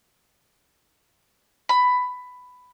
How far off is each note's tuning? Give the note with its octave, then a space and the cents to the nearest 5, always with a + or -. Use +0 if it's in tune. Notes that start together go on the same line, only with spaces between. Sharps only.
B5 +10